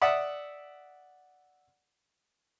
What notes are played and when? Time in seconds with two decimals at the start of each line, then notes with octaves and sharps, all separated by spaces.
0.01 D5 E5 F#5 D#6 E6